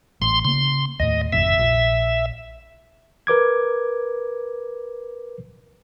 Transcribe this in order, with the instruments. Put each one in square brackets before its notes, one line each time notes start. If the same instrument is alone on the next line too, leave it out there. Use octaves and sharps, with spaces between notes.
[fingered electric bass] A1 [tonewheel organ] C6
[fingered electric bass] C#3 A#3 [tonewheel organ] C6
[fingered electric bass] D#2 A2 [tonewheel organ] D#5
[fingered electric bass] G#1 F2 C3 [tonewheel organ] E5
[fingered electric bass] A#1
[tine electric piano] A#4 B4 D6 G#6